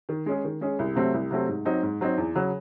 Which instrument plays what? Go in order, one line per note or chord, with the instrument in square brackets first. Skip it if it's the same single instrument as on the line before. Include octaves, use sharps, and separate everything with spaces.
[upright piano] D#3
G#3 C#4 G#4
D#3
G#3 C#4 G#4
C2
C3 F#3 A3 C4
C2
C3 F#3 A3 C4
G#2
F#3 C4 D#4
G#2
F#3 C4 D#4
E2
C#3 F#3